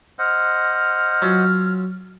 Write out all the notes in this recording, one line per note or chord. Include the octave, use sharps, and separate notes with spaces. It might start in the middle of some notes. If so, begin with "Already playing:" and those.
C5 D#5 F#5 F6
F#3 C#4 F4